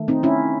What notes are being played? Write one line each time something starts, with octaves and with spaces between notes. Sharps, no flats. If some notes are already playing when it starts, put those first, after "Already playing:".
Already playing: D#3 A3
C4 D#4
C#4 E4